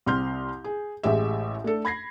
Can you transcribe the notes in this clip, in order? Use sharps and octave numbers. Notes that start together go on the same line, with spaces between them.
C2 C4 C6 F6 G6
G#4
A1 A2 G#3 G4 E5
A3 D4 A4
B5 G#6 A#6 C7